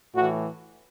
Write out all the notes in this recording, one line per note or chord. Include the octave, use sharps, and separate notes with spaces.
A2 E3 F#4